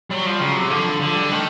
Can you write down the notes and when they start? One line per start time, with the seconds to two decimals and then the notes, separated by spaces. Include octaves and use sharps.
0.10 F#3 G3
0.26 F3
0.35 G3
0.41 C#3 F#3
0.56 C3
0.65 F#3
0.70 D3 F3
1.00 D3 F3
1.16 G3
1.31 D#3 A3